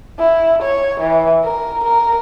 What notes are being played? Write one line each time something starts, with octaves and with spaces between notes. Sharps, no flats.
E4
C#5
E3
A#4
A#4